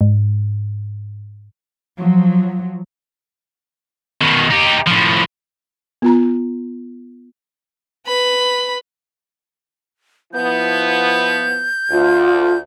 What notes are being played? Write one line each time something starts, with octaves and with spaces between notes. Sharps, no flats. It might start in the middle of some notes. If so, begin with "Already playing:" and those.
G#2
F3 F#3
B2 D#3
D#4 G4
A2 F3
B3 F4 A#5
B4 B5
F3 B3 E4 G6
D2 F4